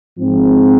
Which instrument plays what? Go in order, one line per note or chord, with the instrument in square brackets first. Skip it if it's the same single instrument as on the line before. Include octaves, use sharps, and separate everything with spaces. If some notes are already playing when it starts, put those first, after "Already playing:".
[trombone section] G#2 F3 C4